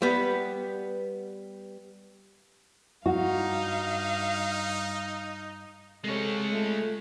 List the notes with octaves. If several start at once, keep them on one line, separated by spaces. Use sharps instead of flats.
G3 B3
G2 D#4 F#4 F5
C3 G#3 A4 C#5
A3 F4 A4